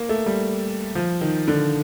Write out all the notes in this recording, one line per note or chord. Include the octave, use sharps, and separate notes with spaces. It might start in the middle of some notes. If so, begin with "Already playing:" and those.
Already playing: A#3
A3
G3
F3
D#3
D3